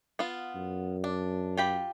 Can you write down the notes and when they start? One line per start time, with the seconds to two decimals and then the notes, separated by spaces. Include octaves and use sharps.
0.19 B3 F4
0.55 F#2
1.04 D4
1.57 F4 G4 B5